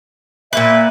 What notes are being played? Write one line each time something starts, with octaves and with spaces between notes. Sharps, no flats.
A#2 A#3 B4 E5